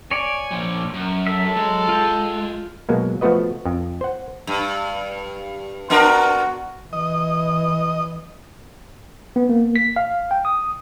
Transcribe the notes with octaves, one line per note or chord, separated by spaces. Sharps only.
C#5 D5 G#5
A#2 F3
F#2
A4 E5
F#3 G#3
F4 G5
B2 F#3 G#3 A#3
F3 A3 B3 F#4 B4 D#5
F2
C5 F#5
G2
B3 D4 F#4 A#4
E3 D#5
B3
A#3
B6
F5
G5
D#6